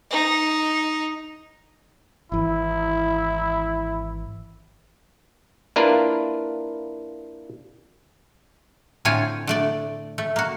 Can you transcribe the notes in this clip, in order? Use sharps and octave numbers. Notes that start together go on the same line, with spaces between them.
D#4
G#1 E3 E4
A#3 D4 E4 F4 A#4 B4
A2 D3 C4 F4 C#5 G#5
D3 A3 D5
A3
A#3 F#4